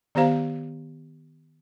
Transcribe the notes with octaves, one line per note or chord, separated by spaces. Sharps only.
D#3 B3 G4 C5 F5 A#5